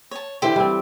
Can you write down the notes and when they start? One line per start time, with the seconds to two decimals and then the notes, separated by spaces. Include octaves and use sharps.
0.11 C#5 A5
0.42 D3 E3 G4 C5
0.56 G3 C4